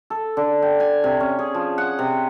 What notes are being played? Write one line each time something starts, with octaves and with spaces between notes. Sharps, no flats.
A4
D3
G5
G#5
C3
C#4
G#4
F3
F#5
C3